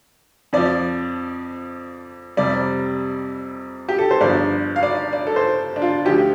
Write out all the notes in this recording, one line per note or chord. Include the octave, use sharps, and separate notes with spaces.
F2 F3 D5
F2 C3 G3 D5
G4
A4
C5
G1 G2 D3 F3 D5
F5
D5
D5
A4
C5
D4
F4
D2 D3 F3 G4